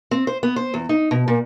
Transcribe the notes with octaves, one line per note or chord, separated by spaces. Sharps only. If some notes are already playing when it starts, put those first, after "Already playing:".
C4
C5
B3
C5
E2
D#4
B2
A#2